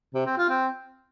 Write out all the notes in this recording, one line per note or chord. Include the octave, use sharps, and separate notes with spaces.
C3
C4
F4
C4